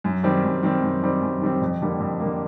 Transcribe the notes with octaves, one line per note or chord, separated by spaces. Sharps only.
F#2
D#3 G3 C4
F#2
D#3 G3 C4
F#2
D#3 G3 C4
F#2
D#3 G3 C4
F2
D3 G3 A#3
F2
D3 G3 A#3